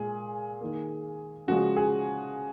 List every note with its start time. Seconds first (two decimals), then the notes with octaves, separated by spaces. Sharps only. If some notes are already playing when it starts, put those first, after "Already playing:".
Already playing: A#2 G#3 G#4
0.61 D#3 A#3
1.48 C#3 F3 G#3 F#4
1.76 G#4